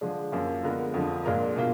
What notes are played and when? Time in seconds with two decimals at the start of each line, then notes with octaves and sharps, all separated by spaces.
0.01 D3 F3 G#3 D4 G#4
0.32 F#2 F3 A#3
0.63 D3 G#3 B3 F4 A#4
0.94 F2 D3 F3
1.25 A#2 G#3 D4 F4 A#4
1.56 B2 A#3 F4